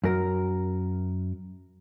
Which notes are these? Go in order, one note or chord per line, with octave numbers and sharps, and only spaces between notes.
F#2 A#4